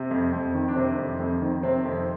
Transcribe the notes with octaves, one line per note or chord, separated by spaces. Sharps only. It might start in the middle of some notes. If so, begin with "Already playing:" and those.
Already playing: C3
F2
F2
D#3
D4
C3 C4
F2
F2
D#3
C3 C4
F2